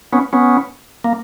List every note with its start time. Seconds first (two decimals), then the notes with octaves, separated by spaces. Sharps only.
0.13 B3 C#4
0.33 B3 C#4
1.04 A#3